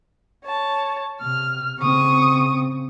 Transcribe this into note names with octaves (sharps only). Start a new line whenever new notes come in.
C#5 A5
C3 F6
C#3 C4 C#6 D#6